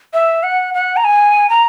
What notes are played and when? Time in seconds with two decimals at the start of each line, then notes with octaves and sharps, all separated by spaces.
0.14 E5
0.43 F#5
0.74 F#5
0.97 A#5
1.04 G#5
1.50 A#5